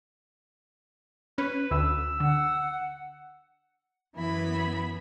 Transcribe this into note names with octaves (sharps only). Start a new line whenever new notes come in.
C#4 B4
D2 E6
D3 F#5
F#2 E3 B3 E4 B5